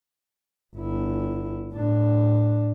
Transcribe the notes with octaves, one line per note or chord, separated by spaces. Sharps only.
G1 E4
A2 D4